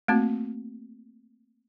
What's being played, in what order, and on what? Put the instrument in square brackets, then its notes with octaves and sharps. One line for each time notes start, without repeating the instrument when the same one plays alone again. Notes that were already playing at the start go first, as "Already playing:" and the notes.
[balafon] A3 A#3 C4 F#4